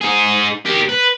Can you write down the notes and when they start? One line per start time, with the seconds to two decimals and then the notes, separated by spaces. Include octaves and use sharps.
0.01 D#4 G#4
0.65 G4 A#4
0.89 B4